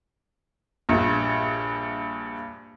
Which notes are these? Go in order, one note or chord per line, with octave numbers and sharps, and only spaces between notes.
A#1 G2